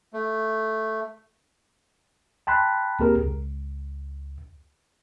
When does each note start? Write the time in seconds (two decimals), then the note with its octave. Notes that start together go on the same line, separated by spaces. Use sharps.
0.13 A3
2.47 G5 A5 B5 C6 F#6
3.00 A#3 C4 G4 G#4 A#4
3.23 C#2